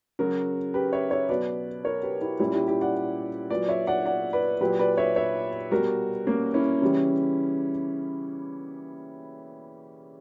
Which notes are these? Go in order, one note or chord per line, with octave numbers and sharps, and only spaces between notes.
C#3 F#3 F#4 A#4
G4 B4
C#5 E5
C#5 E5
B2 F#3 B4 D5
A#4 C#5
G4 B4
E4 G4
A#2 G3 C#4 E4
E4 G4
E4 G4
D5 F#5
A#2 F#3 B4 D5
C#5 E5
D5 F#5
D5 F#5
B4 D5
A#2 F#3 G4 B4
B4 D5
C#5 E5
C#5 E5
B2 G3 F#4 A#4
A#3 C#4
C#4 E4
C#3 E3 G3